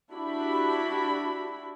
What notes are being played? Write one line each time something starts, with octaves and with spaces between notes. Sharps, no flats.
D4 E4 F#4 G4 B5